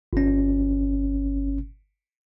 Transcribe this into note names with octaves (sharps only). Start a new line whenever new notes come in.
G1 C#4